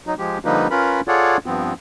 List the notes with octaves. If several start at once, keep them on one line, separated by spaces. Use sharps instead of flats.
F#3 D#4
F3 G#3 G4
D3 F3 G3 A#3 D#4 B4
C#4 F4 A#4 B4 B5
F4 G#4 A4 C#5 D5 F#5
G2 F3 B3 C4